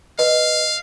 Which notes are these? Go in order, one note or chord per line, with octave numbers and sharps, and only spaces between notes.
B4 D#5 F5